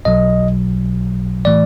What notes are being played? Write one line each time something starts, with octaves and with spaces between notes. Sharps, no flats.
B1 B2 F#3 D#5
A2 E3 A3 D5